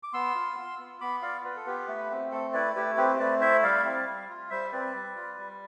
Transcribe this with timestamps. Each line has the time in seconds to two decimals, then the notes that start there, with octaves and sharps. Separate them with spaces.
0.03 D6
0.13 B3 C6 E6
0.35 F4
0.57 F4
0.79 B3
1.01 B3 B5 D6
1.22 F4 D5 F5
1.44 F4 B4
1.56 A4
1.66 B3 G4 B4
1.88 A3
2.11 C4
2.31 A3 A4
2.53 E4 B4 D5
2.75 A3 G4 B4
2.97 C4 G4 B4
3.19 A3 B4 D5
3.41 E4 C5 E5
3.62 G3 D5 F5
3.84 C4
4.07 G3
4.29 F4
4.50 G3 C5 E5
4.72 C4 B4 D5
4.95 G3
5.15 F4
5.38 G3